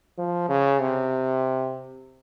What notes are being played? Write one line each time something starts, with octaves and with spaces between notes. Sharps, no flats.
F3
C#3
C3